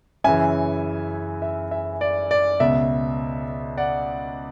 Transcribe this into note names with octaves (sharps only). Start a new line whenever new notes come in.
F#2 C#3 E3 E5 G#5
E5
E5
D5
D5
C#2 B2 E5
D5 F#5